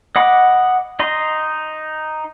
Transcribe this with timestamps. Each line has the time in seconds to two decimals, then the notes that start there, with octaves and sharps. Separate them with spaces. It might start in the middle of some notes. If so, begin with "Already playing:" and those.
0.16 D#5 F#5 B5 D6
0.99 D#4 D#5 C6